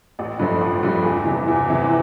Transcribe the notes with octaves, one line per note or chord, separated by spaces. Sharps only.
A1
G2 F3 A3
A1
G2 F3 A3
E2
C3 E3
E2
C3 E3